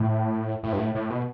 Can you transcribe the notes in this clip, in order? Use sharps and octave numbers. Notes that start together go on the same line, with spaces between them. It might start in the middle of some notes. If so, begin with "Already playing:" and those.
Already playing: A2
A2
G2
A2
A2
B2